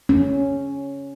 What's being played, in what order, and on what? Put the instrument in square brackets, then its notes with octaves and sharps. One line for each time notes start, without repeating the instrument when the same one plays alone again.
[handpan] C#4